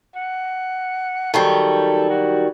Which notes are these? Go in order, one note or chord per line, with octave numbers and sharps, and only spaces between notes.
F#5
D#3 F#3 G3 A4
F#4